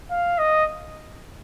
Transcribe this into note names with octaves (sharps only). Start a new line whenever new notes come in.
F5
D#5